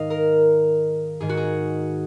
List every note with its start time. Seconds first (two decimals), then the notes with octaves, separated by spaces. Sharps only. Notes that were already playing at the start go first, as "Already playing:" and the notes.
Already playing: G#2 D#3 D#5 F5
0.10 A#4
1.20 G#2 D#3 G#4
1.29 F#4
1.37 G#4